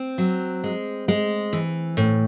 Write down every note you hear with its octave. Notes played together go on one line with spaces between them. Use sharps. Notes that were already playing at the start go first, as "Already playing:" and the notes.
Already playing: C4
F#3
G#3
G#3
E3
A2